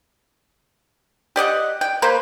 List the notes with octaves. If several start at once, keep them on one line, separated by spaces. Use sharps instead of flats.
G4 D5 D#5 F#5
G5
A#3 B4 C5